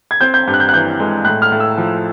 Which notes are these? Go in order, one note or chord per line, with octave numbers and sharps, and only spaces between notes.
G#6
C4 G6
G6
G2 G6
F#6
G6
F#6
E3 G6
G#3
A2 F#6
F6
A2
E6
F3